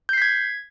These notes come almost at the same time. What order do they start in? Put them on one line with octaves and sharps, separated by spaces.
G6 C7 B6 G#6